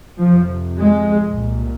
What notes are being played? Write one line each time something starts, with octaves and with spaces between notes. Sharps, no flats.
F2 C3 F3
G#3
C2 A#2